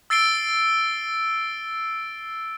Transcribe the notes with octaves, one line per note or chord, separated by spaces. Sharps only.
E6 A6 C7 D7 G7